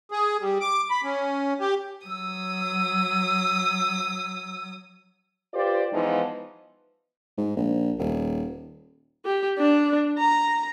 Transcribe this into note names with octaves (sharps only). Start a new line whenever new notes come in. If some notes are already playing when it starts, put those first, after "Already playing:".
G#4
G3
D6
B5
C#4
G4
F#3 D#6 E6
F4 G4 B4 C5 D5
E3 F3 G#3 B3 D#4 F4
G#2
A#1
D#1
G4
D4
A#5